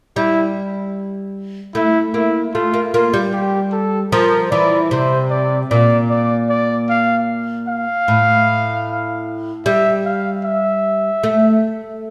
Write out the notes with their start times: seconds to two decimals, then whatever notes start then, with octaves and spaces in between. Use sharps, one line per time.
0.16 G3 E4
1.75 A3 E4
2.14 A#3 E4
2.54 A3 F4
2.74 A#3
2.94 A#3 F4
3.14 G3
3.33 G4
3.72 A4
4.12 F3 A#4
4.51 E3 D5
4.91 C3 C5
5.30 D5
5.71 A#2 D5
6.10 D5
6.50 D5
6.89 F5
7.68 F5
8.08 A2
9.66 G3 E5
10.06 F5
10.45 E5
11.23 A3